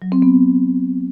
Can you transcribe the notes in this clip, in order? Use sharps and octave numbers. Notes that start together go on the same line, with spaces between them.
F#3
C4
B3